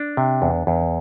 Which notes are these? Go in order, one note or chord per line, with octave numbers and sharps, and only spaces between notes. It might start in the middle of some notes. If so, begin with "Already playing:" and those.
Already playing: D4
C3
E2
E2